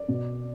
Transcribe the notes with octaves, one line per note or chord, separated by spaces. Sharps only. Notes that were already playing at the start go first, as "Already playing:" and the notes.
Already playing: D5
B2